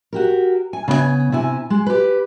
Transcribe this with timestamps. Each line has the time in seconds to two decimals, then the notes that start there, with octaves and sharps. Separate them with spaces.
0.13 F#4 G4 A#4
0.73 G#5
0.88 C#3 B3 D5 G#5
1.32 C3 E4 G#5
1.70 G#3
1.86 G4 B4